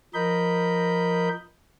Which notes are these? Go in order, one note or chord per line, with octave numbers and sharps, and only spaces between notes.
F3 A#4 D#5 B5 G6